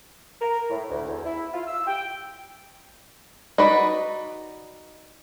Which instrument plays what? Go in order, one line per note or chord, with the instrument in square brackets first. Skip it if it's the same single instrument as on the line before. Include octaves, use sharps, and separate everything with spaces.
[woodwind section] A#4
A2
D2
E2
E4
F4
E6
G5
[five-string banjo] D#4 F#4 B4 D5